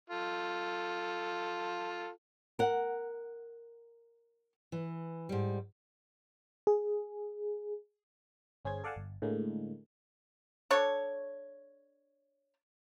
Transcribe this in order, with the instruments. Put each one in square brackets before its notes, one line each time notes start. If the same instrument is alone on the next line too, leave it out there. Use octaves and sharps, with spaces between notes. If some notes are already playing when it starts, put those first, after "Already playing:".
[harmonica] F4 A4
[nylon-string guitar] A#4 F#5
[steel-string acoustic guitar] E3
G#2 G3
[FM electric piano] G#4
G1 C#4 G#4 C5 G#6
A4 D5 F5 F#5 G#5 A5
G1
A2 D3 G#3 A#3
[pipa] D4 A4 C#5